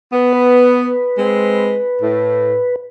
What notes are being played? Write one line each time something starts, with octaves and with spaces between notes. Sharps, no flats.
B3
B4
G#3 C4
A2